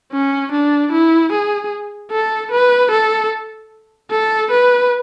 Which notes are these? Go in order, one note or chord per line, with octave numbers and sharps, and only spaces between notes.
C#4
D4
E4
G#4
A4
B4
A4
A4
B4